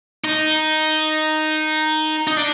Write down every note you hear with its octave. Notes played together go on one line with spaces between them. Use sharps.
D#4
D#4
D4